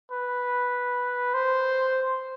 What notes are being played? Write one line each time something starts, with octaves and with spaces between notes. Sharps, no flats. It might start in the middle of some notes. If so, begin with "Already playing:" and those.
B4
C5